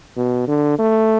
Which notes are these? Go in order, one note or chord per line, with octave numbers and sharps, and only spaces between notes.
B2
D3
A3